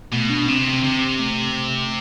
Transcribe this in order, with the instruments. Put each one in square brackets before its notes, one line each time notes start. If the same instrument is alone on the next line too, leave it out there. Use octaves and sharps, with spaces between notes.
[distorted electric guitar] B2 [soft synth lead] A3
[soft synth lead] D4
[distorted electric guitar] C3 [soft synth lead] C4
[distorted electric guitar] C3
[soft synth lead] A3